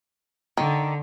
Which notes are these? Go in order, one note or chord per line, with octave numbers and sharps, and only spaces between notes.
D3 D#3